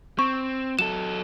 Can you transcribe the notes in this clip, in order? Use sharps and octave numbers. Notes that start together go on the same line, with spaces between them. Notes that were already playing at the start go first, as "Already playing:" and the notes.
C4 C#6
F#3 A4 E7